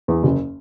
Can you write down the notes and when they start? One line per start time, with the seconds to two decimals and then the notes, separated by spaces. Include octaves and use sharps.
0.08 E2
0.23 F#1